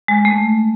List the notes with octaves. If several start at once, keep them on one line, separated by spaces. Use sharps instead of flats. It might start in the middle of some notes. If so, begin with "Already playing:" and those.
G#3
A3